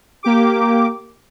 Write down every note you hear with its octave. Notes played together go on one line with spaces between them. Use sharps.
A#3 G4 D6